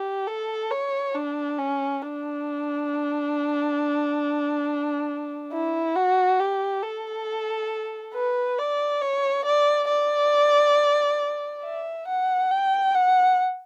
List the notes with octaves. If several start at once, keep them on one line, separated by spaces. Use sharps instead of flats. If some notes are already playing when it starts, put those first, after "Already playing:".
Already playing: G4
A4
C#5
D4
C#4
D4
E4
F#4
G4
A4
B4
D5
C#5
D5
D5
E5
F#5
G5
F#5